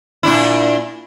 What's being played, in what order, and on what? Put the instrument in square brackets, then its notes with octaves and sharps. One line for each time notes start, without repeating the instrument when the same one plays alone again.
[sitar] A#2 D4 E4